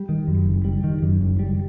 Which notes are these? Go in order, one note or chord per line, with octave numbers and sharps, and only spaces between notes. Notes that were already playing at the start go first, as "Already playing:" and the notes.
Already playing: G3
D#3
F#2
F#1
G3
D#3
F#2
F#1
G3